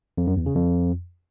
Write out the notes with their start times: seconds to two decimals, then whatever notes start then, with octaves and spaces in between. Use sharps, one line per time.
0.18 F2
0.27 F#2
0.37 E2
0.46 C#3
0.56 F2